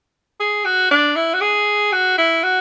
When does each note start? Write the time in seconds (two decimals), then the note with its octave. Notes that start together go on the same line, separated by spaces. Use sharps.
0.40 G#4
0.65 F#4
0.91 D4
1.16 E4
1.34 F#4
1.41 G#4
1.92 F#4
2.18 E4
2.43 F#4